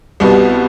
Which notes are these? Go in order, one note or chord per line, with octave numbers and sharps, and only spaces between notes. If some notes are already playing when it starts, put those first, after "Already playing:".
C2 B2 G3 B3